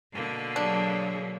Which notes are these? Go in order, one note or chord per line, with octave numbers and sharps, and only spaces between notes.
B2 D3 A#3
F#3 D4 G#4